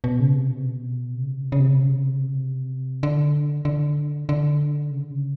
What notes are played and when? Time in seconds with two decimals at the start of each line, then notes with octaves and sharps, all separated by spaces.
0.04 B2
0.20 C#3
0.35 C3
0.51 B2
0.60 C3
0.69 B2
1.14 C3
1.22 C#3
1.29 C3
1.37 C#3
1.43 C3
1.52 C#3
1.60 C3
1.67 C#3
1.74 C3
1.82 C#3
1.89 C3
1.98 C#3
2.04 C3
2.13 C#3
2.19 C3
2.28 C#3
2.35 C3
3.03 D3
3.65 D3
4.29 D3
4.91 C#3
5.00 D3
5.11 C#3